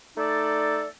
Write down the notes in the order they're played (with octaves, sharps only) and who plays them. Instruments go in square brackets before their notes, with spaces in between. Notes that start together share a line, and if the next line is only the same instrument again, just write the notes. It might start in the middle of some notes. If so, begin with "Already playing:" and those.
[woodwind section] A3 D#4 A4 D5